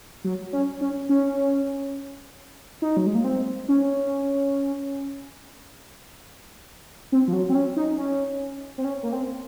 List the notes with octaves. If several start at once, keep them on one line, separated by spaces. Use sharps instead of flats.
F#3
C#4
C#4
C#4
D#4
F#3
G#3
A#3
C4
C#4
C4
F3
F#3
C4
C#4
D#4
C#4
C4
C#4
A#3
C4